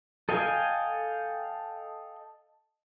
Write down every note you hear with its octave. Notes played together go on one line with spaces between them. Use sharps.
A4 D#5 F5 G5 G#5